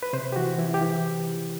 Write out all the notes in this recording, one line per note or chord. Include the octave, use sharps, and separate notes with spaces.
B4
C3 C5
G4
E3 F#4
E3 E4
G4
E3